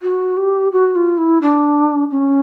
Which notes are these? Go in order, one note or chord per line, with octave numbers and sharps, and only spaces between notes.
F#4
G4
F#4
F4
E4
D4
C#4